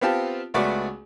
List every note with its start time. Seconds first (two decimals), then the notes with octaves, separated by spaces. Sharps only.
0.01 B3 C4 F4 G4 A5
0.54 C#2 A3 B3 F#4 D5 D6